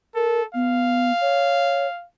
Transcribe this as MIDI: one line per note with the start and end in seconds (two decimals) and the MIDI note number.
0.15 0.45 69
0.15 0.41 70
0.55 1.12 59
0.55 2.05 77
1.21 1.86 73